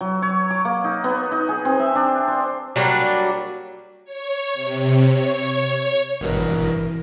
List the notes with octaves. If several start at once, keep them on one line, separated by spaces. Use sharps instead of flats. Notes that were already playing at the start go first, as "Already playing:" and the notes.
F#3
C#5
D6
A#3
D#4
B3
D#4
G#4
C4
E5
D4
C5
F#3 G3 A#3 D4
C#5
C3
C#5
G#1 G2 B2 E3 A#4